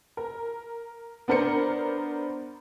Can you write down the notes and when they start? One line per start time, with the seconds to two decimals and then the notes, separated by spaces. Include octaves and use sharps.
0.17 A#4
1.28 B3 D4 A#4 C5 C#7